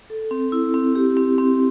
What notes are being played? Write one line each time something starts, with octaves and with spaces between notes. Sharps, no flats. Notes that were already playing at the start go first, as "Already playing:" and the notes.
A4
C4
E4
C4
G4
C4
C4